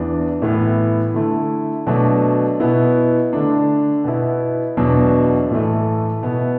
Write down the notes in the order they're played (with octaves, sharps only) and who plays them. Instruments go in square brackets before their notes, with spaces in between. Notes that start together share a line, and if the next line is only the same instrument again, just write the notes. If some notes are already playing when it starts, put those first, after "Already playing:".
Already playing: [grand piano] E2 E3 D4
A2 E3 B3 E4
D3 A3 E4
B2 F#3 A3 D4
B2 B3 E4
D3 A3 D4
B2 B3 E4
E2 B2 F#3 D4
A2 E3 A3
B2 B3 E4